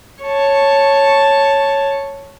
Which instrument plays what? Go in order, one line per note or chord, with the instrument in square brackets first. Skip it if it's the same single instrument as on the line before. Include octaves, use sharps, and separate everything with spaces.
[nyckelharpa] C#5 A5